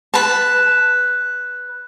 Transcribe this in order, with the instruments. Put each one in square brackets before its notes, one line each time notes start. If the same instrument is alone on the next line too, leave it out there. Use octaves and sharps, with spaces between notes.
[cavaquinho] B4 A5